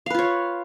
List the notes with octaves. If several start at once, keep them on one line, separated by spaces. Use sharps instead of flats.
F4 B4 C#5 F5